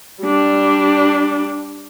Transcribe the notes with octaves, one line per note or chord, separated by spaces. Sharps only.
G3 D4